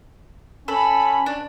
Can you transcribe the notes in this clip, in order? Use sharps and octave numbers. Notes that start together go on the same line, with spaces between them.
C#4 A4 B5
D4